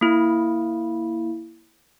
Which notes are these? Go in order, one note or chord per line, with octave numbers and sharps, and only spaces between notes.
A#3 E4